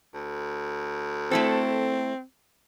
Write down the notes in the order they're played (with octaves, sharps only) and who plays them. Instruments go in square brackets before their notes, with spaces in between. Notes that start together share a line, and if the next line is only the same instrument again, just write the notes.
[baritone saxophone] D2
[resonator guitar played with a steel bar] A3 E4 A4 [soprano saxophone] C4